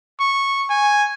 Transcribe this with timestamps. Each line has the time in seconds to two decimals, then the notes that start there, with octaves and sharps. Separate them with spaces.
0.20 C#6
0.70 G#5